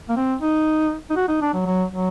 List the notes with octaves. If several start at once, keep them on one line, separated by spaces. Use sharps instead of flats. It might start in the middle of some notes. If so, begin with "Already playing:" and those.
A#3
C4
D#4
D#4
F#4
D#4
D4
F#3
F#3
F#3